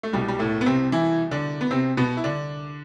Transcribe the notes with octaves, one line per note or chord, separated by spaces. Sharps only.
A3
C2 B2 G3
G3
A2 A3
B3
C3 C4
E3 E4
D3 D4
B3
C3 C4
B2 B3
E4
D3 D4